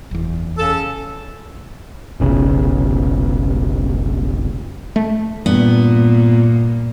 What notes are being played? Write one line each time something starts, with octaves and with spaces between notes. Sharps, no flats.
F#1 E2
C#3 A4
F1 B1 C#3
A3
G2 A#2 B3